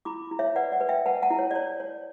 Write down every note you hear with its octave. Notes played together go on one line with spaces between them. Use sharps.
E4 B5 D6
E4
C#5 E5
B4 D5 F#5
D5 F#5
B4
E5 G5
B4 F#5 A5
F#5 A5
E4
C#5
D5
C#5
C#5